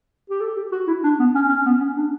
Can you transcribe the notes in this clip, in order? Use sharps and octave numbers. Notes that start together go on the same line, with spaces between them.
G4
A4
G4
F#4
E4
D4
B3
C#4
C#4
B3
C#4
D4